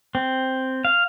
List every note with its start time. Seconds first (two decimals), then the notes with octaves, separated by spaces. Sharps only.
0.15 C4
0.85 F5